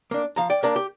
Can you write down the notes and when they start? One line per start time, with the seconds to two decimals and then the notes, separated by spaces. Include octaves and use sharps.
0.11 A#3 D4
0.36 F3 F5 A#5
0.50 D5 G5
0.63 A#3 D4 A#4 D5
0.76 G4